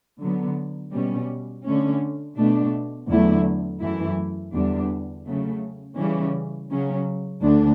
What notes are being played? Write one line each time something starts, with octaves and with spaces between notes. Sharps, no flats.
D3 F#3 B3
B2 G3 C#4
D3 A3 C#4
B2 A3 D4
E2 D3 F#3 A3 E4
F#2 E3 A3 E4
E2 D3 G3 D4
C#3 F#3 A3
C#3 E3 G3 C#4
C#3 F#3 C#4
D2 D3 A3 D4